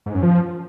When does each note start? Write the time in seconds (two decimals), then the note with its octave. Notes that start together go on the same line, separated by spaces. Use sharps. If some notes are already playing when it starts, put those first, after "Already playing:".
0.06 G#2
0.14 F#2
0.23 F3